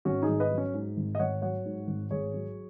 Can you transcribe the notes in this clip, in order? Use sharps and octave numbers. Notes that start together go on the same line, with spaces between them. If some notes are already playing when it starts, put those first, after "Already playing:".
G#1 C#4 F#4
D#4 G#4
G#1
B4 D#5
F#3
C#4
G#2
G#1
D#5
G#1 C#5 F#5
F#3 C#5 F#5
G#2
G#1
G#1 G#4 C#5
F#3